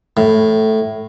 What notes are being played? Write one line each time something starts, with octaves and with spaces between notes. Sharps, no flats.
A2